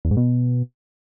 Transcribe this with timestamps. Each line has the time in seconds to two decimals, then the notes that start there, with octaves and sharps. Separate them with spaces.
0.05 E2
0.11 G#2
0.17 B2